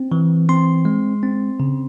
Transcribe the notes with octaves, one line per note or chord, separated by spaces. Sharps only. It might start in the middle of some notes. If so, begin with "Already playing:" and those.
Already playing: C4
E3
C4 C6
G#3
C4
C#3